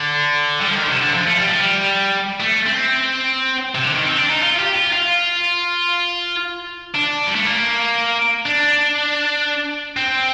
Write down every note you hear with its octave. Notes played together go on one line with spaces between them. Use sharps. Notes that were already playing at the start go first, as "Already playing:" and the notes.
Already playing: D3
G3
F3
D#3
D3
C3
D3
F3
A3
G3
F3
G3
A3
C4
C3
D3
D#3
C4
D4
D#4
F4
G4
F4
F4
D4
G3
A3
A#3
D4
C4